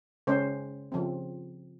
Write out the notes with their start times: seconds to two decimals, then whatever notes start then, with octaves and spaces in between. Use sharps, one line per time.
0.27 C#3 G#3 C#4 C5
0.92 C#3 F3 C4